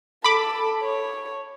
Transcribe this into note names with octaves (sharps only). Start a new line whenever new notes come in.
A4 B5 D6
C#5